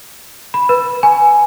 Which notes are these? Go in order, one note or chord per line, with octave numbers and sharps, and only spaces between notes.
B5
B4
G#5